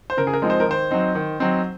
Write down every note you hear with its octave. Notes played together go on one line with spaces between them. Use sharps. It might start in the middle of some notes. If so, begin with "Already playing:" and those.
C5
C#3 A#4
G#4
A#4
F3 G#3 C4 D#4
C5
A#4
D#3 C5
F#3 C4 D#4
D#3
F#3 C4 D#4